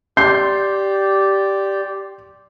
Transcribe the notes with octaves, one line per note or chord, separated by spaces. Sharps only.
G4 D5 C6 G6 C7